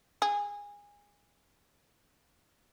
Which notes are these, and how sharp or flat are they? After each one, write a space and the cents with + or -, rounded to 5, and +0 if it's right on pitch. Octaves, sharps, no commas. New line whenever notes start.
G#4 -20